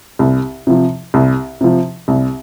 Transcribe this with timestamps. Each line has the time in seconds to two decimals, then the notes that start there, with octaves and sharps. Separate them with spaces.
0.19 C2
0.67 C3 F3
1.14 C2
1.61 C3 F3
2.08 C2